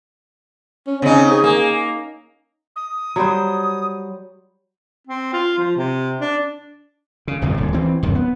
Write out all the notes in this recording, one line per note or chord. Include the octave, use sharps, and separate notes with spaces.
C#4
C#3 C4 D#4
G#4
A#3
D#6
F#3 G3 C5
C4
F4
F3
C3
D4
C#3
G1 C2 F2 A2
D1 G#2
E3 C4
D1 F#2 C3 D#3
B3